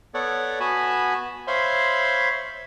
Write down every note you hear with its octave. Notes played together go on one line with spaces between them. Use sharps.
B3 A4 C#5 D5 F#5
B3 F#4 G#5 A5 B5
C5 C#5 E5 F5 B5 C6